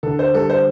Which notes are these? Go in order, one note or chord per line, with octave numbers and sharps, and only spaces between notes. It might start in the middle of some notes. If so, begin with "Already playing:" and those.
D3 A4
C5
G3 A4
C5